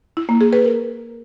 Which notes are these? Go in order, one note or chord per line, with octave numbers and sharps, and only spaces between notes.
E4
A#3
G#4
B4
A#4